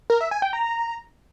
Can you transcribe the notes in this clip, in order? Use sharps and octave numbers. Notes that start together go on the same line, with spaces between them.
A#4
E5
G#5
G5
A#5